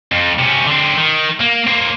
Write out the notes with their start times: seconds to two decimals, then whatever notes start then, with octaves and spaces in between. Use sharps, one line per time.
0.12 F2
0.39 C3 C#4
0.67 D3 C4
0.97 D#3
1.41 A#3
1.67 A#3 C4